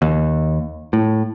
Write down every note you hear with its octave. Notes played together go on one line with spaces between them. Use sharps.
D#2
A2